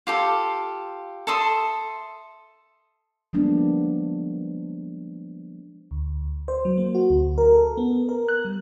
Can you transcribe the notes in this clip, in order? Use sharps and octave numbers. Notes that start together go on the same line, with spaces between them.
F4 G4 A4
A4 E5 C6 D#6
F3 G3 G#3 A#3 B3 D4
D2
C5
F#3
A#3
F#4
D2
A#4
A4
B3
A#4
F#6
G3